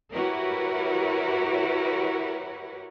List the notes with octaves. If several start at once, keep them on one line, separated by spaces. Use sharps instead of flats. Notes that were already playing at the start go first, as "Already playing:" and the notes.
E4 F#4 G4 A#4 B4 C#5